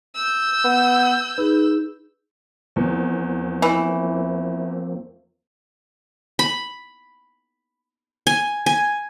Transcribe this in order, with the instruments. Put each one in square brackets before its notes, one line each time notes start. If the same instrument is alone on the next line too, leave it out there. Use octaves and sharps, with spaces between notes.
[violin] E6 G6
[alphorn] B3
[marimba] D#4 G#4 [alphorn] B4
[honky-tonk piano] E2 [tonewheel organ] F3 A#3 C4
[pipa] E3
[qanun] B5
G#5
G#5